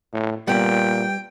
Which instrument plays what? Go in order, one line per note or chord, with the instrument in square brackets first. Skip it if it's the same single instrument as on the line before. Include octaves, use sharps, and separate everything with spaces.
[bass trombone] A2
[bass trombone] A#2 [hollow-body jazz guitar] G3 B3 [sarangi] G5